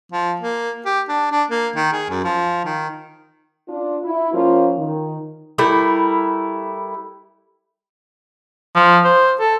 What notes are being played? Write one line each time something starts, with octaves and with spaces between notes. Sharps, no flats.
F3
A#3
G4
D4
D4
A#3
D#3
G#4
F#2
F3
D#3
D4 F4
E4
F3 A#3 C#4 F4
D#3
G3 A3 E4 A#4
F3
C5
A4